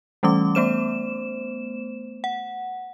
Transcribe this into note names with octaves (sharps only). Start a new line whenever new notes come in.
E3 G3 A3 C#4 D6
A3 B3 C5 E7
F#5